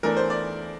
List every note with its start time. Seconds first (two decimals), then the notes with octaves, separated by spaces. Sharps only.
0.03 E2 E3 A3 D4 A#4
0.17 C5
0.30 D5